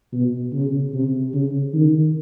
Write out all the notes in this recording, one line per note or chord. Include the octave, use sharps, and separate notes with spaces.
B2
C#3
C3
C#3
D#3